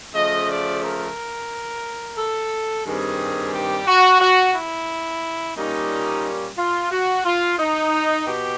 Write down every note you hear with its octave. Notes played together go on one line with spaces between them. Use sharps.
C#3 F3 A3 D#5
D5
A#4
A4
G2 D#3 G3 C4 G#4
G4
F#4
F#4
E4
A#2 G3 A#3 C#4 D#4
F4
F#4
F4
D#4
B2 G4